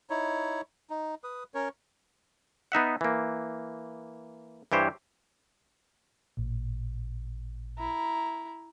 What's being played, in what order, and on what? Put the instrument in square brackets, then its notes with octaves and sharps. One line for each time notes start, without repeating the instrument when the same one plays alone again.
[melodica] D#4 E4 C#5
D#4
B4 D#6
C#4 A#4 C#5
[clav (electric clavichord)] B3 D#4 E5 F#5
E3 A#3
G2 E3 G4 C5 C#5
[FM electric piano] A1 A#2
[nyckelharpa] E4 A#5